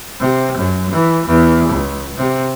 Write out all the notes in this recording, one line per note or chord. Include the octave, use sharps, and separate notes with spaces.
C3
F#2
E3
E2
C#2
C3